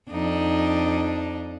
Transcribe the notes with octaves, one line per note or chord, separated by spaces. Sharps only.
F2 D4 D#4